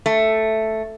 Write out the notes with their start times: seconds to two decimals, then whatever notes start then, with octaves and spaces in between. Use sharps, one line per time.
0.06 A3